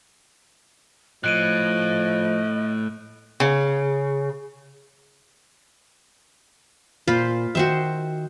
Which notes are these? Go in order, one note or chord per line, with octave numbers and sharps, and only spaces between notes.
A2 F3 D#5 F#6 D7 D#7
C#3
A#2 F4 C5 B5
D#3 F#4 C5 E5 G5